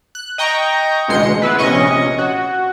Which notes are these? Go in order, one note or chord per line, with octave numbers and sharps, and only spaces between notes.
F#6
D#5 G5 A#5 C#6
A1 D2 B2 G#3 C6 C#7
B3 E4 B4
A#1 C3 C#4 D#5 C#6
F#4